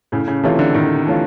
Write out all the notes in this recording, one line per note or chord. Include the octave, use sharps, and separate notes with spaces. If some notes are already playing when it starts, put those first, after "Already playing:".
A2 C#3
C#3
C3 E3 A3 C#4 F4
D3
A2 D#3
E3 A3 C#4 F4